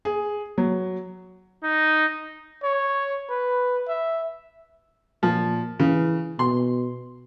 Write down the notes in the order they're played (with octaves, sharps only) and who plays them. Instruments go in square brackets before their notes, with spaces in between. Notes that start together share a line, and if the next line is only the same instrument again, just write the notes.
[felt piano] G#4
F#3
[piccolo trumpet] D#4
[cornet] C#5
B4
E5
[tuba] A#2 [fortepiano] F3
[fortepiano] C#3 [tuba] E3
[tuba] B2 [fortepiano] C6